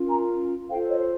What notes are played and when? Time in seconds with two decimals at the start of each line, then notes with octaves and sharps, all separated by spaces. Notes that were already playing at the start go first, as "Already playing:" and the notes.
Already playing: C#4 F4 A#4
0.09 G#5 A#5
0.69 F4 A4 C5 F5 G5
0.89 C#5 D#5